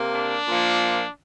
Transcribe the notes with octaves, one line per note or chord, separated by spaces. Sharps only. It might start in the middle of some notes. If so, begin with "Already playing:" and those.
Already playing: C3 A#3
D4
A#2 F3 A#3